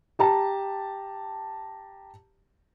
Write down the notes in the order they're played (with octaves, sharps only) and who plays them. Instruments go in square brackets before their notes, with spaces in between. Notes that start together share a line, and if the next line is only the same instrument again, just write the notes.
[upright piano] G4 A5 A#5